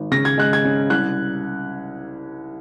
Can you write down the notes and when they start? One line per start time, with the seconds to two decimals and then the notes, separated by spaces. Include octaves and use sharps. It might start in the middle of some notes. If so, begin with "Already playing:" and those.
Already playing: G#1
0.11 C#3 A#6
0.25 G#6
0.38 G#3 F#6
0.53 G#6
0.65 C#4
0.90 C2 F#6